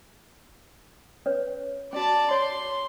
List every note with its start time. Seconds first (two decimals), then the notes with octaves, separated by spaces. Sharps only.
1.26 C#4 B4 C#5
1.93 C#4 F#4 D5 A5
2.31 C#5 C6